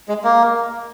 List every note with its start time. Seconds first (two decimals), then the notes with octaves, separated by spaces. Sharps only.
0.09 G#3
0.24 A#3